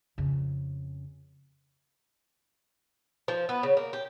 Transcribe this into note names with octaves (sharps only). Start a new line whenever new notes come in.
F2 C#3
F3
B3
C#3
A#3
G4